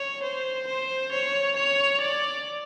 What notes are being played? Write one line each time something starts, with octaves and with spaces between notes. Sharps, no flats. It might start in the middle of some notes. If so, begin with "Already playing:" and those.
Already playing: C#5
C5
C5
C#5
C#5
D5